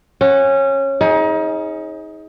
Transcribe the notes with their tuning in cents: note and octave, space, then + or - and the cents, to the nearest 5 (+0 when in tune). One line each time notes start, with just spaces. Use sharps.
C#4 -20 F#5 +0
D#4 +30 G#4 +0